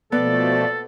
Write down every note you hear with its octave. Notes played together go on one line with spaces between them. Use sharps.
B2 F3 A3 B3 A4 D5